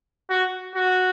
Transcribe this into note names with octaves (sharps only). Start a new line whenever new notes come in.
F#4
F#4